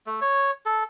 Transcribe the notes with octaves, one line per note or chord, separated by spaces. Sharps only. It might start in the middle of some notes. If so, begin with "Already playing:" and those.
A3
C#5
A4